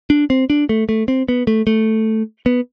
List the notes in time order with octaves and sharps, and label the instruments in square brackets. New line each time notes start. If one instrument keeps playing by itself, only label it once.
[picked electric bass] D4
C4
D4
A3
A3
C4
B3
A3
A3
B3